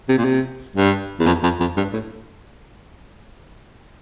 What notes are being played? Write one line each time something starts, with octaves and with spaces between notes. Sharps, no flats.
C3
A#2
C3
G2
E2
F2
F2
F2
G2
A2